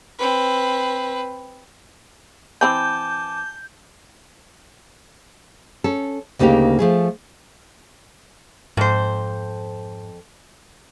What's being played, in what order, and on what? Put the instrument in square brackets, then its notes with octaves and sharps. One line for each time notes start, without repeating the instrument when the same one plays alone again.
[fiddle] C4 B4
[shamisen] E3 C4 B5 [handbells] G#5 A5 D6 [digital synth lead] G6
[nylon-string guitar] C#4 A4
D2 C#3 A#3 D#4 G4 F5
F3 A3 G#4
[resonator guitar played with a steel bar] F2 C5 [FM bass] G#2